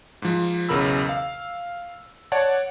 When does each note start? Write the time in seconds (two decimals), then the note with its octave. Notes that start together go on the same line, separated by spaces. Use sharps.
0.22 G#2 F3
0.69 B1 E2 C#3 A#4 B5 E6
1.09 F5
2.32 C#5 D5 F#5 A5